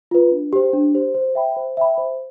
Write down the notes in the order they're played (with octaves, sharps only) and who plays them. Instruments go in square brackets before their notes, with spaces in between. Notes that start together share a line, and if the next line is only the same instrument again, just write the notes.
[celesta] F4 B4
D4
G4 C5
D4
G4 C5
C5
E5 G5 B5
C5
E5 G5 B5
C5